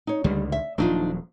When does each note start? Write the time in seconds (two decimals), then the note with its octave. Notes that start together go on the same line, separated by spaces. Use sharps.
0.07 D#4 C#5
0.24 C#2 D3 D#3 G3
0.52 E5
0.78 D#1 F3 F#3 D4 D#4 F4